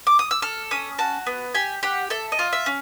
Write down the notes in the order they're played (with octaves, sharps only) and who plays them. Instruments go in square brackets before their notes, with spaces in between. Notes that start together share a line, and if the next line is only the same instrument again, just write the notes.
[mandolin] D6
D#6
E6
A4 F6
C#4 D#6
F#4 A5
B3
G4 G#5
G4 F#5
A4 E5
D#5
F4
E5
C#4